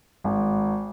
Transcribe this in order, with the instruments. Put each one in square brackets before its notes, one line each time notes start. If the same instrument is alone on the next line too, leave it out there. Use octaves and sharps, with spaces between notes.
[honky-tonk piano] G#1